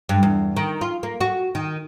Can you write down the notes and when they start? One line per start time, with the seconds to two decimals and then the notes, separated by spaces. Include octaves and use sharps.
0.09 G2
0.23 E2
0.57 D#3
0.81 F4
1.03 A#3
1.21 F#4
1.55 D#3